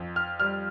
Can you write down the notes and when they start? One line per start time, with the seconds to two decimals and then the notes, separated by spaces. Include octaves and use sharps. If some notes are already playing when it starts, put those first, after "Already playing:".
Already playing: F2
0.16 F6
0.40 G3 F6